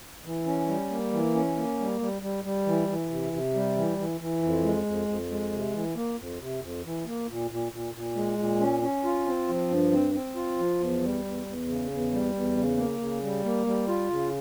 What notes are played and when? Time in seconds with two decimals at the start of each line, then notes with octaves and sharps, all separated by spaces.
0.25 E3
0.46 C#4
0.68 G3
0.90 A#3
1.12 E3
1.35 C#4
1.57 A#3
1.79 G3
2.01 G3
2.22 G3
2.44 G3
2.66 E3
2.88 E3
3.10 C3
3.33 C3
3.55 G3
3.77 E3
3.98 E3
4.21 E3
4.43 F2
4.64 G#3
4.86 F2
5.08 F2
5.30 G#3
5.53 C3
5.74 E3
5.96 A#3
6.18 F2
6.40 C3
6.62 F2
6.84 E3
7.06 A#3
7.28 A#2
7.51 A#2
7.72 A#2
7.94 A#2
8.16 G#3
8.38 A#2
8.60 C#4
8.82 C#4
9.04 F4
9.26 C4
9.48 F3
9.70 G2
9.92 C4
10.14 C4
10.36 F4
10.59 F3
10.80 E2
11.03 G3
11.25 E2
11.46 E2
11.68 C#3
11.91 E2
12.13 G3
12.34 E2
12.56 C#3
12.77 A#3
13.00 C#3
13.22 G3
13.44 A#3
13.66 G3
13.88 F4
14.10 C#3